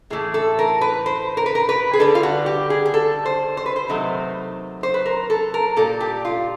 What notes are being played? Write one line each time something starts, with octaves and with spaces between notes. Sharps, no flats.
A2 E3 A3 G#4
A4
A#4
B4
C5
A#4
B4
A#4
B4
G#4
D3 G3 A4
F4
F#4
G4
G#4
G#4
A4
C5
C5
B4
C5
C3 D#3 F#3 A3
C5
B4
A#4
A4
A#4
A#2 G3 A4
G4
F4